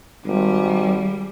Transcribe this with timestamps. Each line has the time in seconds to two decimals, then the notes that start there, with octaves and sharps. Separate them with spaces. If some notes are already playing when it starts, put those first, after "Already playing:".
0.25 G#1 G3